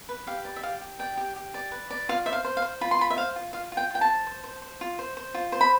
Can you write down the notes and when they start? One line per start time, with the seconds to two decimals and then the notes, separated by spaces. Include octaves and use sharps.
0.09 B4
0.27 G4 F5
0.45 D5
0.56 E5
0.63 G4 F5
0.81 G4
0.99 D5 G5
1.17 G4
1.36 G4
1.54 D5
1.72 B4
1.91 D5
2.09 F4 F5
2.26 C5 E5
2.33 F5
2.45 C5
2.57 F5
2.62 C5
2.81 F4 B5
2.91 C6
2.99 F4 B5
3.10 E5
3.17 C5 F5
3.36 F4
3.53 F4 F5
3.72 F4
3.77 G5
3.90 F4 G5
4.01 A5
4.08 C5
4.27 C5
4.44 C5
4.62 C5
4.81 F4
4.99 C5
5.17 C5
5.34 F4
5.52 C5
5.61 B5